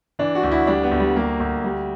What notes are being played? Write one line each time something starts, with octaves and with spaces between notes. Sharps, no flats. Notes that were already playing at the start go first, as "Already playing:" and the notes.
E3 D4
F#4
D2
E4
G3 D4
B3
D2
G3
G3 A#3
D2
G3